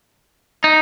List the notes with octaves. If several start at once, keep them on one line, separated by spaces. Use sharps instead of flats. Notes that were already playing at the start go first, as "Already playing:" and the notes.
D#4